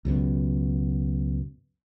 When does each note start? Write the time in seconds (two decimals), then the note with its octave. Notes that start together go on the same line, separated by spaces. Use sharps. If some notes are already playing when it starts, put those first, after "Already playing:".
0.05 C#2 F#2 B2